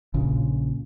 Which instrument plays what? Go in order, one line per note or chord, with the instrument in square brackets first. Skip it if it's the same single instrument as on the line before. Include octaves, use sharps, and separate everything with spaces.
[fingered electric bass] A#1 A#2 C#3